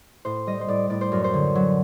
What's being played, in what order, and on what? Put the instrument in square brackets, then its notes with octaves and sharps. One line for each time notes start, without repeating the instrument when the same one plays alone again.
[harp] A2 C5
G3 D#5
C5
A2 D5
A2 D5
C5
F#2 A#4
C5
D3
F#3